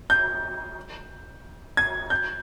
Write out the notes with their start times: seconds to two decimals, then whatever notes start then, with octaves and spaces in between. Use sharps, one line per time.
0.10 G6
1.77 G#6
2.10 G6